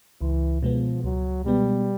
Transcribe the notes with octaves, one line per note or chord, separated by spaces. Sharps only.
C#2 E3
B2 F3 G#3 B3
C#2 F#3
B2 G3 G#3 B3